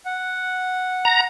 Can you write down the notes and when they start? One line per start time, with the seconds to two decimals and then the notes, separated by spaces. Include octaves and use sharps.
0.05 F#5
1.05 A#5